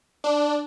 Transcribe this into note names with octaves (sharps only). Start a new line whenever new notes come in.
D4